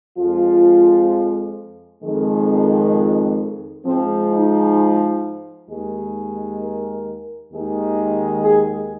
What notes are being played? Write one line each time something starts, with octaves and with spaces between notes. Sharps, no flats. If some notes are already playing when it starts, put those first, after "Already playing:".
F2 F3 G#3 F4
F2 D#3 G#3
G#2 F3 G#3 C4
D#4
D#2 D#3 G#3
A#4
D#2 D#3 G#3
G#4